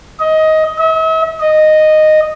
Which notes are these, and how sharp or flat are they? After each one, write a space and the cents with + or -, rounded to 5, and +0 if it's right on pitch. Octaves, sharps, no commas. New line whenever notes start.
D#5 +15
E5 -45
D#5 -10